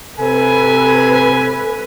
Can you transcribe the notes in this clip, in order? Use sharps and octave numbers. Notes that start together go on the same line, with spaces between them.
C3 A4 B4 G#5